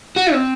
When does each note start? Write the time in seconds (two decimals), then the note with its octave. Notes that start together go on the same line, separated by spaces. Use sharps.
0.16 F#4
0.33 C4